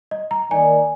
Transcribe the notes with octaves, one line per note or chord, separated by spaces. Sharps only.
D#5
A#5
D#3 A#3 D#4 A#4 D5 G#5